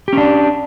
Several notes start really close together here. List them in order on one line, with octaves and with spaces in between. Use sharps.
G4 C#4 D4